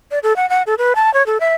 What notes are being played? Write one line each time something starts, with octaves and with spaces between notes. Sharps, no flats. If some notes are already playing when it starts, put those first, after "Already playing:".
D5
A4
F#5
F#5
A4
B4
A5
C#5
A4
E5